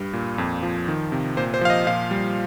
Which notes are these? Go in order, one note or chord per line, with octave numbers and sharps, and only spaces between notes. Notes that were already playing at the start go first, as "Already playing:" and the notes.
Already playing: G2 G3
A#2
F2
F3
D#3
C3
A#2 C5
C5
F3 F5
D#5
A#2 F5
G3